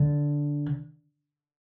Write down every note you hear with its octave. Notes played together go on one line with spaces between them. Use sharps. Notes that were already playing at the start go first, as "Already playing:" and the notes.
Already playing: D3